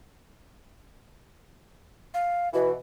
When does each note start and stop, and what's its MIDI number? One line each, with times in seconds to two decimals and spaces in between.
2.14 2.49 77
2.54 2.72 47
2.54 2.72 52
2.54 2.71 66